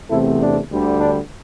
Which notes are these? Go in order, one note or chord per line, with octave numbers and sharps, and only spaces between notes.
E2 C3 A3 C4 E4 A4
D4
D2 D3 G3
D4